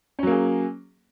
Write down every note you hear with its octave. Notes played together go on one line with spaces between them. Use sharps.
F#3 A#3 C#4 G#4